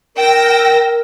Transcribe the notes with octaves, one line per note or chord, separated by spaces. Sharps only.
A#4 G5 E6 A#6